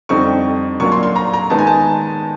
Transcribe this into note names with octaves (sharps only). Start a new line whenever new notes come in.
F2 D3 G3 C4 D#4 C#6
A#2 F#3 A#3 D4 F4 C#6
C6
C6
A#5
A#5
D#3 G#3 B3 D#4 A5
G#5
A5